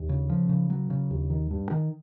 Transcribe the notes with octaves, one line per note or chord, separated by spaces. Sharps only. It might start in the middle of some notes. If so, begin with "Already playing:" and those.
Already playing: D#2
C#3
F3
C#3
F#3
C#3
D#2
D#3
G2
D#3